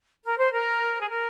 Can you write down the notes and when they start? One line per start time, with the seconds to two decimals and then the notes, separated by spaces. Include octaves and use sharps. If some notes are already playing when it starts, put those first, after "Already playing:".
0.23 A#4
0.37 C5
0.52 A#4
1.01 G#4
1.09 A#4